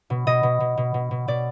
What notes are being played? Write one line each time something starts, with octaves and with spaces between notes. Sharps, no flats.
B2
B2 D#5
B2
B2
B2
B2
B2
B2 D5